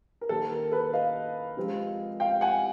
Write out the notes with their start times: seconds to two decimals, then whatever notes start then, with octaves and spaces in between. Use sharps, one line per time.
0.21 A#4
0.29 D#3 G3 A#3 A4
0.51 A#4
0.72 A4 B4
0.93 D#5 F5
1.57 C3 F3 G#3 C4
2.20 F5 G5
2.41 F#5 G#5